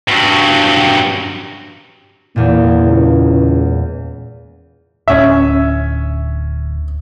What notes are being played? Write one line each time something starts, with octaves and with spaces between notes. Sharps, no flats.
G2 F#3
E2 A#2 A#3
C#2
D1 C#4 E5